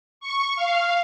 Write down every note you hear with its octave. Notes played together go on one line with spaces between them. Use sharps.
C#6
F5